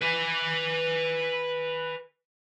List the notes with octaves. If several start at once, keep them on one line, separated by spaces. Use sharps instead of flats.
B4 G#5